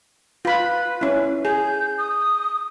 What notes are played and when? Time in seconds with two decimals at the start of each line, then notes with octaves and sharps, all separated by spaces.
0.45 F4 B4 B5
1.01 C#4 E4
1.45 G#4 G6
1.98 D#6